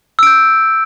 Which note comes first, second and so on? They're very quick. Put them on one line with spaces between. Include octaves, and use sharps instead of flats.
E6 D7 G6